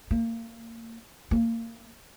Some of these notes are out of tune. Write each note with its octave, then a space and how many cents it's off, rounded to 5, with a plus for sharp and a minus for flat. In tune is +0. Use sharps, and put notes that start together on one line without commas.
A#3 -30
A#3 -25